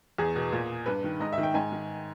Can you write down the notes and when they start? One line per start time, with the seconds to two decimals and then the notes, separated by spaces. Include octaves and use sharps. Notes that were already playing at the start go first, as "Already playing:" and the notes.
0.18 E2 G#4
0.36 B2
0.52 A#2
0.86 G2 B4
1.04 D#3
1.20 G#2 D#5
1.33 E5
1.38 D#3
1.43 G5
1.54 G#2 G#5
1.72 D#3